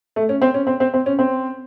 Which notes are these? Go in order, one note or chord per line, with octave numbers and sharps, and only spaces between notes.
A3
C#4
C4
C#4
C4
C4
C4
C#4
C4